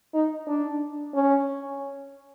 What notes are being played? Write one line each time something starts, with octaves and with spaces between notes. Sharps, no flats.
D#4
D4
C#4